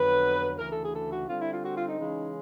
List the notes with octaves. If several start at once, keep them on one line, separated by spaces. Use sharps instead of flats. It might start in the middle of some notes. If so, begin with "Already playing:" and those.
Already playing: F2 D3 F#3 B3 B4
D2 C#3 E3 A#4
A4
G#4
A4
F#4
D3 G3 C4 F4
E4
F4
F#4
F4
D#4
C#3 E3 G#3 C#4